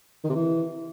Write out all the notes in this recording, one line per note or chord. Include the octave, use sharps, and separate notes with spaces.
D#3
C3
E3